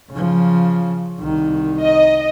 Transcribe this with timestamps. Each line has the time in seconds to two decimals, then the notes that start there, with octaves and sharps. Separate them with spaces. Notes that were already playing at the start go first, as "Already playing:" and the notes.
0.11 C#3 F3
1.20 C2 D#3
1.82 D#5